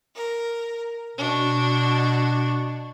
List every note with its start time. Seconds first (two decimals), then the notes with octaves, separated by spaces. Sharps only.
0.15 A#4
1.17 B2 D4 F#4